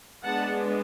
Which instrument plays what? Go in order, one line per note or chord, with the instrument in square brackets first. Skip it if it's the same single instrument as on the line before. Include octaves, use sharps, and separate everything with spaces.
[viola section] G#3 B3 D4 F#5 A5